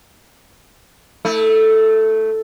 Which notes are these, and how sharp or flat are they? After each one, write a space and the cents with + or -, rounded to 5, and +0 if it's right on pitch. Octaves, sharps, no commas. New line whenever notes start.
A3 +0 E4 -35